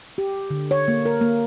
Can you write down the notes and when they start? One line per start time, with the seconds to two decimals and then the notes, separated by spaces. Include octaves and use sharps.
0.18 G4
0.50 D3
0.71 C#5
0.88 A#3
1.06 A#4
1.21 A#3